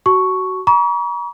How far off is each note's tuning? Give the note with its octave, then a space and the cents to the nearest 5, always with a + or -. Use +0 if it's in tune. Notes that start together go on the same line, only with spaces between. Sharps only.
F#4 +20 A5 +0 C#6 +0
A#5 +40 C#6 +40